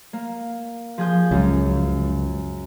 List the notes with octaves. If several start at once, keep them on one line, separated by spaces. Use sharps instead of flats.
A#3
F3 G#4 G6
C#2 F#2